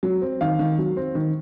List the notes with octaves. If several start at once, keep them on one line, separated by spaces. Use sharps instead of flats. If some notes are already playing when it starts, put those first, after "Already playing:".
F#3
C4
D#3 F5
D#3
F#3
C4
D#3